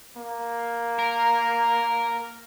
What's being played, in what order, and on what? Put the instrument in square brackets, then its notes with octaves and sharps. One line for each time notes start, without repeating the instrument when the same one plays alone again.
[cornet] A#3
[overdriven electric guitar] A#4